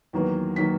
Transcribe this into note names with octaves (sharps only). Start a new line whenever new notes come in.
E2 D#3 F#3 A#3
D#3 F#3 A#3 B6